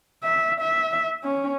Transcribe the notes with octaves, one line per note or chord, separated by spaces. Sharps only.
E5
E5
C#4